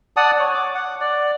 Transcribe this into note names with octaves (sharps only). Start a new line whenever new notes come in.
D5 F#5 A5 D#6
C#5
D6
F#5
D5